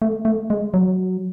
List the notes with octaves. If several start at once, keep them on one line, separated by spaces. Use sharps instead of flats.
A3
A3
G#3
F#3